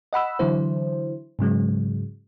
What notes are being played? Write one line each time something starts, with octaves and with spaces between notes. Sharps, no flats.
D#5 F#5 B5 E6
D3 E3 F#3 E4 C5
G#2 C#3 F#3 G#3